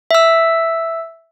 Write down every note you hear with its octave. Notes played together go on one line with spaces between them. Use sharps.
E5 E6